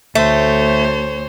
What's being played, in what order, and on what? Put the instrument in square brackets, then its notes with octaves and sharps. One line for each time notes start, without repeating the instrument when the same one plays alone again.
[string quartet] D2 C5 C#5 [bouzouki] A3